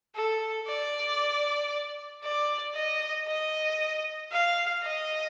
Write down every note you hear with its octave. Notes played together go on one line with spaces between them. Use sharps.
A4
D5
D5
D#5
D#5
F5
D#5